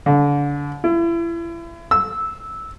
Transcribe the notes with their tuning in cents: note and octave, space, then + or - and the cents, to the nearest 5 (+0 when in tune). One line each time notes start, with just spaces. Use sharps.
D3 -30
E4 +35
E6 -10